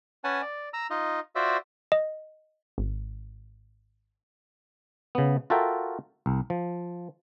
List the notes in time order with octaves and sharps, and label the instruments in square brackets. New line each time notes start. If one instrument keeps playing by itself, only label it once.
[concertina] C#4 B4 F#5 G#5 A5
D5
A#5 E6
D#4 F4 D#5
F4 F#4 C5 D5 E5
[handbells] D#5
[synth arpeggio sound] G#1
[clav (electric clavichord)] C#3 B3
F4 F#4 A4 A#4 E5 G5
C2
F3